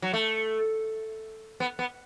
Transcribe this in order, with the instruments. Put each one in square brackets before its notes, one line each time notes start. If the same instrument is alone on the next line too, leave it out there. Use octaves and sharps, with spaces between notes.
[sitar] F#3
A3
B3
B3